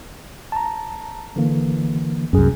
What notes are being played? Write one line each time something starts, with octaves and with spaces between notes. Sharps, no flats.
A5 A#5
D3 E3 A#3
C2 F#2 C#4 G#4